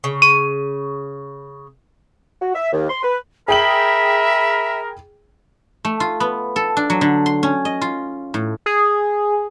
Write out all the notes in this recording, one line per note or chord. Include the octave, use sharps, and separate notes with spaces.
C#3
C#6 D#7
F#4
E5
D#2
C6
B4
G#4 A#4 E5 G5 B5 F#7
A3
F4
B3
A4
D4
F#3
D3
C6
C#4
D#5
F4
A2
G#4